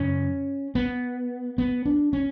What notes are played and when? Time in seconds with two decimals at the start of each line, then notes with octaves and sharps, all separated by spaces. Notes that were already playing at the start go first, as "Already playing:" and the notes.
Already playing: F#2 C#3 C#4
0.75 B3
1.58 B3
1.86 D4
2.13 C#4